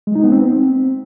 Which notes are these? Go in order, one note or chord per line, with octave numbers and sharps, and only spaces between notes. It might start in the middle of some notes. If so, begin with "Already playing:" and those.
G#3
D#4
B3
C4